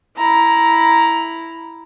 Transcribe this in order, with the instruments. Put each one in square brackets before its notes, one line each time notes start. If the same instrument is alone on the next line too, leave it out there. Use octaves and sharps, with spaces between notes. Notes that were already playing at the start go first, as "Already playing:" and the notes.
[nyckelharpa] E4 A#5